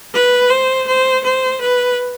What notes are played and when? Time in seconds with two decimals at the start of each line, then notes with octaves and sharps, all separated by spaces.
0.14 B4
0.50 C5
0.88 C5
1.24 C5
1.61 B4